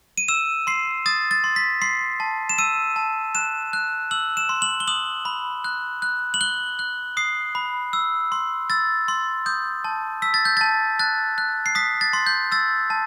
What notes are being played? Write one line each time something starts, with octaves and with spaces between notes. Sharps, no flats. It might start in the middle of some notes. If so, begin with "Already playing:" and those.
D#7
E6 E7
C6 C7
D#6 A6
A6
C6
B6
C6 C7
A5
E7
E6 D#7
A5
F#6 E7
F#6
E6 F#7
E7
C6
F#7
G7
D#6 F#7
B5
F#6
F#6
F#7
F#6 G7
F#6
D#6 C7
B5
E6
C6
E6 A6
C6
D#6 G6
A5
E6 B6
A6
G6
A5 A6
F#6 A6
F#6
C7
D#6 B6
A6
C6
G6
E6 A6
A5